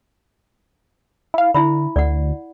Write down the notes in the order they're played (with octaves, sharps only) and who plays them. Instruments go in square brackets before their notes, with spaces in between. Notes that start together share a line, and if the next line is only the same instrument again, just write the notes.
[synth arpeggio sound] E4 F5
[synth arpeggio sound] D3 [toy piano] E4 E5 B5
[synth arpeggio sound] D2 [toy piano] D5 F#5